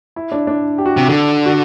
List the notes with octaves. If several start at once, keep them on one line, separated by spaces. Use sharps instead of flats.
E4
D4
D4
G4
F#4
C3
D3 A4
F#4